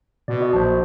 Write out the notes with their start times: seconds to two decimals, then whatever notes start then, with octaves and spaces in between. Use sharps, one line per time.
0.28 B2 D5
0.41 F#4 D#5
0.53 A#1 C5 A5